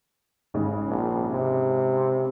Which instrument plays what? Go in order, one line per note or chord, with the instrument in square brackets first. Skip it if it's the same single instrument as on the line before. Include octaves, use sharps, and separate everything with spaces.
[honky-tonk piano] G#1 C#3 G#3
[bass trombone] A#1
C3